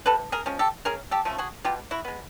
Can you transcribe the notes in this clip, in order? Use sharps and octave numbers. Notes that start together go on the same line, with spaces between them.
C3 A4 B4
G#4 A#4
F3 G#3 C#4
G4 A4
C#3 G#4 A#4
G4 A4
F3 A3 C#4
F#4 G#4
B2 F4 G4
E4 F#4
G#3 B3